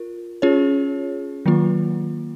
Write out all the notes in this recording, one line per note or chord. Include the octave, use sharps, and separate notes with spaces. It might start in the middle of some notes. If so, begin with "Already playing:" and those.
Already playing: F4 A#4
C#4 F4 G#4 C#5
D#3 F#3 A#3 F4